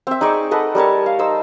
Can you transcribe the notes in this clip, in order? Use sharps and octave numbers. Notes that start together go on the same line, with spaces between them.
C4 E5
D#4 G#4 D5 C#6
A4 B4 D#5 F#5
G3 A#4 C#5 A5
F5
D#4 C5 E6